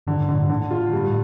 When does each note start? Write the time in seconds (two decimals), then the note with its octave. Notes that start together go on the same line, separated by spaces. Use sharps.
0.07 G2 D3
0.21 G2
0.29 D3
0.35 A2
0.49 A2 D3
0.71 F4
0.93 G2